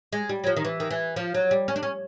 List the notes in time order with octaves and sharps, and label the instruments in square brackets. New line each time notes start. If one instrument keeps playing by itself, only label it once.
[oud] G#3
G3
F#3
F3
D#3
E3
D#3
E3
F3
F#3
G3
C#4
D4
C#4